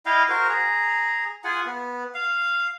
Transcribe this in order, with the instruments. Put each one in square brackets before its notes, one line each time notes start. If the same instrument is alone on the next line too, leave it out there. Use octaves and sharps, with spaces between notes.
[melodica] E4 D#5 F5 G5
F#4 A#4 C5
G#4 A#5
F4 G#4 F#5 G#5
B3
F5